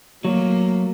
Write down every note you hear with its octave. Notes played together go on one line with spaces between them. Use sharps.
F#3 A3 A#3